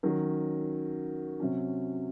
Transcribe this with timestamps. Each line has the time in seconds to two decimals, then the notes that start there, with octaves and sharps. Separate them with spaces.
0.03 D#3 F#3 C#4
1.40 C3 F#3 C#4